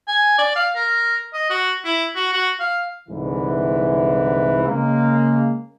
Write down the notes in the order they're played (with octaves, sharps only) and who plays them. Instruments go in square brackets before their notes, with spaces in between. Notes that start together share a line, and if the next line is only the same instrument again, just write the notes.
[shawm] G#5
D5
F5
A#4
D#5
F#4
E4
F#4
F#4
F5
[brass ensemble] C2 G#2 D3 E3
C#3 G#3 A#3